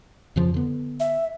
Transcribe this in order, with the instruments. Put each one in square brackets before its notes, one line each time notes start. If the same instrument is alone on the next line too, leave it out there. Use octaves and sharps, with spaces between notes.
[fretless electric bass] F2 C#3 F3
D3 B3
[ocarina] E5